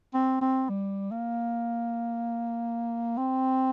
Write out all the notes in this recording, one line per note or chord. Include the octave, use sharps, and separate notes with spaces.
C4
C4
G3
A#3
C4